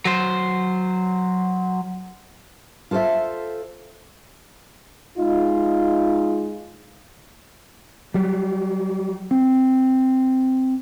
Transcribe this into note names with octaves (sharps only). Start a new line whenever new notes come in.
F#3 C5
F4 A4 B4 C5 E5
G#3 D#4 F4
F#3 G3
C4